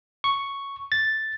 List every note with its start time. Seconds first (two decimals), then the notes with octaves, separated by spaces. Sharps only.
0.24 C#6
0.92 A6